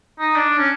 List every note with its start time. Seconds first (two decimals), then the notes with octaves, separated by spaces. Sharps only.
0.19 D#4
0.36 D4
0.58 C#4